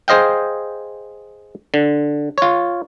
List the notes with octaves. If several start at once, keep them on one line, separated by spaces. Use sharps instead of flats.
G#4 C5 D#5 F5 G5
D3
F4 C#5